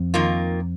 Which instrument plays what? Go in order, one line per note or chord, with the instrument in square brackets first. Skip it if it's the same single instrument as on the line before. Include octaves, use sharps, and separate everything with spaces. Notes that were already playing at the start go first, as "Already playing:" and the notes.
Already playing: [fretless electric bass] F2
[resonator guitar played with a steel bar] D#3 A#3 F4 A#4